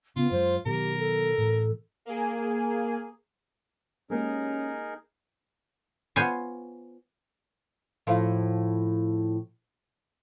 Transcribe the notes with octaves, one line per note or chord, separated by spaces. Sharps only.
C#3 B3 F4
F#2 G#3 C5
B2 D#3 F#3 G4 A#4
A4
A2 E3
A#3 G#4
G#3 A#3 C#4 D#4 G4 G#4 A#4
B3 F4 C5 C#5 G#5
A2 F3 F5